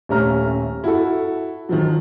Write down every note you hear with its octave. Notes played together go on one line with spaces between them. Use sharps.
D#1 A3 C#4 A#5 F6
E4 F#4 A4
D#3 F3 F#3